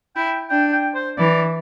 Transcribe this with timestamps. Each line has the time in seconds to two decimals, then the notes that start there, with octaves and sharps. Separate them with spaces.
0.16 E4 G5
0.50 D4 G5
0.73 G5
0.95 C5
1.17 E3 D5